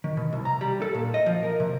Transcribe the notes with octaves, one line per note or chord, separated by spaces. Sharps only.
D#3
B2
C2
A#5
G3
A4
A#2
D#5
F3
A#4
C3